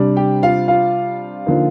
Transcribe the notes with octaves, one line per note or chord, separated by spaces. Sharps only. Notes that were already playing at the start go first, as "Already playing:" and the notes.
Already playing: C3 G3 D4
G4 G5
F4 F5
F4 F5
D3 F3 A#3 D#4